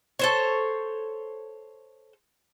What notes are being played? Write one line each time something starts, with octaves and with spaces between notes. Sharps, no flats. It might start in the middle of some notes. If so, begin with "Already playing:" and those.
A4 C5 C#5